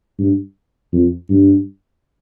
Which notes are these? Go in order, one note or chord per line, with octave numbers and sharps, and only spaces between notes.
G2
F2
G2